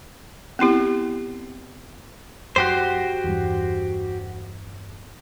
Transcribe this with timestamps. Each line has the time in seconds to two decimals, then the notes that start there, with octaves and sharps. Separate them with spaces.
0.59 B3 C4 E4 G4
2.56 F#2 F#4 G4 C5
3.24 E2 G2